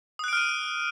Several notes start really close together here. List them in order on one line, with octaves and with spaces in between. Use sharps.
D#6 F#6 D7 F6 D#7